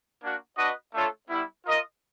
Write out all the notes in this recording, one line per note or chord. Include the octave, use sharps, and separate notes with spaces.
A#3 D4 F#4
D4 F#4 B4 D#5
A3 D4 F4 A4 C#5
G3 B3 E4
F4 A#4 D#5